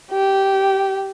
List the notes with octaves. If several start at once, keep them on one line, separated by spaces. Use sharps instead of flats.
G4